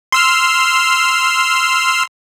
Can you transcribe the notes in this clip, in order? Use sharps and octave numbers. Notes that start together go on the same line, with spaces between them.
C6 E6 F6